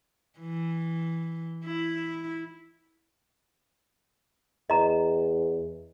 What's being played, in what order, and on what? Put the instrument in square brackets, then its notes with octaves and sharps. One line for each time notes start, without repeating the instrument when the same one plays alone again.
[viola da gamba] E3
E4
[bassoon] E2 [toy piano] D#5 A#5